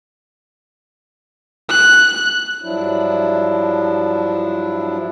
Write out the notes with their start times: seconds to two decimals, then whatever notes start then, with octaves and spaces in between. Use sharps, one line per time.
1.69 F#6
2.62 G2 F3 F#3 D4 E4